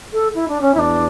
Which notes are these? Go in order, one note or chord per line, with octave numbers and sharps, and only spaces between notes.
A4
E4
D4
C#4
E4
E2 D4